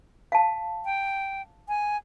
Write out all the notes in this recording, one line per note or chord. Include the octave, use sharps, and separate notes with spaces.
F5 A5
G5
G#5